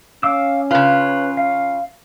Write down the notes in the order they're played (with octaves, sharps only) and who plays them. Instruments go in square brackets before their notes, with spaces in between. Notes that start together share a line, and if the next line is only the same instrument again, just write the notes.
[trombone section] C#4 [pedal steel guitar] F5 D6 E6
[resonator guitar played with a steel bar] C#3 F4 [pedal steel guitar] B4 B5
[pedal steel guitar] F5